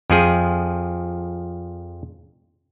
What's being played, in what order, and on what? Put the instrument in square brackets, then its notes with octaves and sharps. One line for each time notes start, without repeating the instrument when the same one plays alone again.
[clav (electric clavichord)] F2 F3 G#4